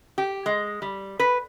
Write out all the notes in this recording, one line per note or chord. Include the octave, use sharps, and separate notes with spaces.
G4
G#3
G3
B4